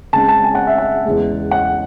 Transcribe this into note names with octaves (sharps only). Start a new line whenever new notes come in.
C#3 G#3 C4 A5
A5
G#5
F#5
E5
F#5
E2 C#3 G#3
F#5